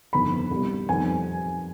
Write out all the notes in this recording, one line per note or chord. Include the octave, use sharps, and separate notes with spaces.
G1 F2 D#3 B5
C2 B2 G3
F2 D#3 G3 G#5